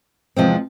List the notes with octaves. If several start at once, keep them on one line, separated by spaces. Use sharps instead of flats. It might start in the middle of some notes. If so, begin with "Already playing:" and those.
E2 C3 F3 G#3 C4